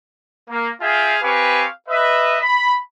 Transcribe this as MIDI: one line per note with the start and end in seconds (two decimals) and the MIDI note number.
0.50 0.69 58
0.81 1.16 65
0.81 1.16 68
0.81 1.16 76
0.81 1.16 77
0.81 1.16 79
0.81 1.16 80
1.22 1.65 60
1.22 1.65 67
1.22 1.65 71
1.22 1.65 77
1.22 1.65 80
1.22 1.65 85
1.89 2.37 71
1.89 2.37 75
1.89 2.37 76
2.41 2.74 83